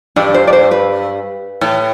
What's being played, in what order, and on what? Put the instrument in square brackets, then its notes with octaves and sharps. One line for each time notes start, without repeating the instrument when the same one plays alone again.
[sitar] G2 [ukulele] D4 D5
[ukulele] C5
D5
C5
B4
[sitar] A2